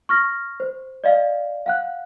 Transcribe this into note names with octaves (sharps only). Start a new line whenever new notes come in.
C#6 F6 A#6
C5
D5 D#5 F5
F5 F#5 F#6